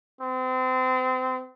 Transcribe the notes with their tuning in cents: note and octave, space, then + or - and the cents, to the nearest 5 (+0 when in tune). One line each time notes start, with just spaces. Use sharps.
C4 -30